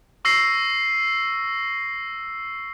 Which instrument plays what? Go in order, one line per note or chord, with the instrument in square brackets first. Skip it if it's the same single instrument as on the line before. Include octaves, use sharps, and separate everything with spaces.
[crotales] C#6 E6 A#6 C7